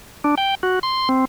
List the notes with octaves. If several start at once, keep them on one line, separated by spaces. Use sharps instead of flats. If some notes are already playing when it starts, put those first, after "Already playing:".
D4
G5
F#4
C6
C4